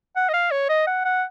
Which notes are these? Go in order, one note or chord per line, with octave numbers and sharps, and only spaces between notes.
F#5
D#5
F5
C#5
D#5
F#5
F#5